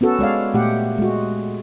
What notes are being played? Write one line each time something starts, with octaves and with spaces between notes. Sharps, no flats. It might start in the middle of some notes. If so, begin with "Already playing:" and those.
B3 C#4 F#4 A4
G#3 C#5 D5 F5
A#2 A3 G4 F#5
G#3 F#4